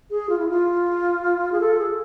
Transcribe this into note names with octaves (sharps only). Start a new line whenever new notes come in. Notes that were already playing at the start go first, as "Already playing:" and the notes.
G#4
F4
E4
F4
G#4
A4
G#4